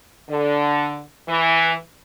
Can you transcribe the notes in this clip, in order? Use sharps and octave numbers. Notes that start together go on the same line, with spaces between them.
D3
E3